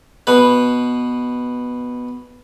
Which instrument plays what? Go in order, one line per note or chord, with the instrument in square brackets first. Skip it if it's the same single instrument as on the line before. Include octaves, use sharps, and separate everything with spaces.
[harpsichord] B2 B4